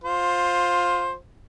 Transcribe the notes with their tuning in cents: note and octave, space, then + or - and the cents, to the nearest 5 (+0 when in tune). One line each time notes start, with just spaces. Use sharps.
F4 +15 C5 +10